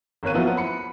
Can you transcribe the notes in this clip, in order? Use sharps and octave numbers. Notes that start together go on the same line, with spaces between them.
G#1 A#3 A#4 C#5 F#6 D#7
F3 F#3 B3 E4 F4
B5 C#7